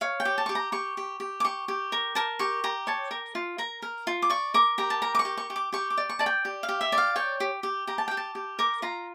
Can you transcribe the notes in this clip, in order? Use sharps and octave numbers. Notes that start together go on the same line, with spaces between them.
C#5 F5
G5
G4
A5
G4 C#6
A#5
G4 C#6
G4
G4
D6
G4 C#6
G4
A#4
A#4 A5
G4 C#6
G4 A#5
C#5 A5
A#4
F4
A#4 A#5
A#4
F4
D6
D5 C#6
A#4 D6
G4 A#5
A5
A#4 A#5
D6
C#6
G4
C#6
G4
D6
G4 C#6
D6
D5
C#6
D5 A5
G5
G4
F5
G4
E5
D5
F5
C#5 G5
G4
G4
G4 A#5
A5
G4 G5
A5
G4
A#4 D6
F4 A#5